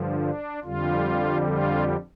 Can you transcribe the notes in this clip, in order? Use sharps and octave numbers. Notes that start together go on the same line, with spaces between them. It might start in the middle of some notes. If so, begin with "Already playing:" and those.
Already playing: G2 D3 F3
D4
F2 D3 G3 F4
F4